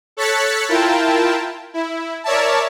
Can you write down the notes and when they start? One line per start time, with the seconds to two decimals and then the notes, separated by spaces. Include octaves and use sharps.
0.17 A4 C#5 F#6 A6 B6 C#7
0.69 E4 F4 A#4 G5 A5
1.74 E4
2.24 A#4 C#5 D5 E5 A5